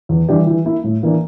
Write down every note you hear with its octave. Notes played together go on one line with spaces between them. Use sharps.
E2
E3 G3 D4 G4
E3
A#3 E4
A2
E3 A#3 D4